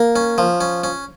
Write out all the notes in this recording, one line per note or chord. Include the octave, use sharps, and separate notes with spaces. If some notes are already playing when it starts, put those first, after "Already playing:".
Already playing: A#3
C#4
F3
C#4
C#4